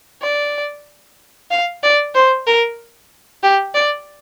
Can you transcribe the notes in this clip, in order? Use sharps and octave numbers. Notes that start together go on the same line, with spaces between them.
D5
F5
D5
C5
A#4
G4
D5